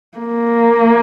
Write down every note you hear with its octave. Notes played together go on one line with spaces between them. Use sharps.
A#3